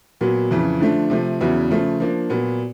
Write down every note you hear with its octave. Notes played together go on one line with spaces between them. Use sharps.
A#2 F#3 B3
F2 C#3 E3
D3 F3 A3 D4
C3 F3 A3
E2 C#3 F#3 B3 E4
C#3 F3 A3
F3 A#3 D4
A#2 F#3 B3